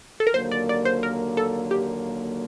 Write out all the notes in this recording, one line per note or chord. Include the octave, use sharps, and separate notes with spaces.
A4
A#4
D#2 D3 F#3 A#3 C5
D5
D5
C5
A#4
A4
G4